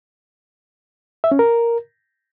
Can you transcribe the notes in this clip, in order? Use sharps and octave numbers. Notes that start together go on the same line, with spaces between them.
E5
C#4
A#4